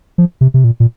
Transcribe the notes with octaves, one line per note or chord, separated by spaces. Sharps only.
F3
C3
C3
A#2
A#2